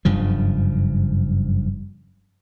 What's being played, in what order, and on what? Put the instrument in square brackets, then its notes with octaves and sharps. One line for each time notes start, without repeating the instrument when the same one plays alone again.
[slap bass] F#1 G2 C#3 F3